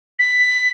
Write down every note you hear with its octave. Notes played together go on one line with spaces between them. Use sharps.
B6